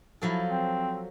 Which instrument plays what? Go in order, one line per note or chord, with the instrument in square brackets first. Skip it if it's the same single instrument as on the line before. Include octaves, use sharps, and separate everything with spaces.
[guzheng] F3 F#3 A4 [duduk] E4
[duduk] C4